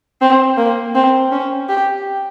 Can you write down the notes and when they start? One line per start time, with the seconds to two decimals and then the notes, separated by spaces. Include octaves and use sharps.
0.21 C4
0.58 A#3
0.95 C4
1.32 C#4
1.69 G4